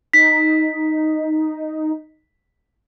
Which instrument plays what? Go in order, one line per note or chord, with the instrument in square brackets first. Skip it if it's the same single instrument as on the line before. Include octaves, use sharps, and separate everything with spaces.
[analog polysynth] D#4 [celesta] B6